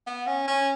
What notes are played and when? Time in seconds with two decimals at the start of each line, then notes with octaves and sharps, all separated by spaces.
0.07 B3
0.27 C#4
0.47 C#4